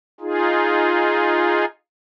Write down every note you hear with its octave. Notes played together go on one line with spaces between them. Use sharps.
D#4 F4 G#4